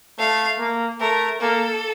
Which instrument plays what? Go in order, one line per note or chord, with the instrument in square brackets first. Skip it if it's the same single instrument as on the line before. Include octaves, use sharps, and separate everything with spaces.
[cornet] A3 [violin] F5
[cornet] A#3
[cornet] A3 [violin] A#4
[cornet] A#3 [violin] A4